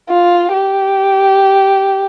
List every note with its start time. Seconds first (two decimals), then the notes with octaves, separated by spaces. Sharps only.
0.09 F4
0.53 G4